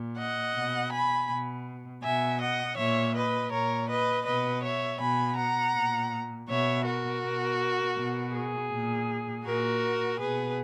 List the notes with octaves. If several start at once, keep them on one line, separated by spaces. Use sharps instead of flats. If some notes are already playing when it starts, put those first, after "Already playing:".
Already playing: A#2
D#5 F#5
B2
G#5 B5
B2
B2 E5 G#5
D#5 F#5
A#2 C#5 E5
B4 D#5
A#2 A#4 C#5
B4 D#5
B2 B4 D#5
C#5 E5
B2 G#5 B5
F#5 A#5
A#2
B2 C#5 E5
F#4 A#4
B2
B2
G#4
A#2
A#2 F#4 A#4
B2 G#4 B4